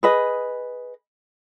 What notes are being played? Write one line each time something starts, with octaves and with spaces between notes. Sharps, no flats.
G#4 B4 D#5